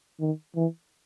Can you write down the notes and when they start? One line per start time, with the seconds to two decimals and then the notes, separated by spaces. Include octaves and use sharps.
0.20 D#3
0.55 E3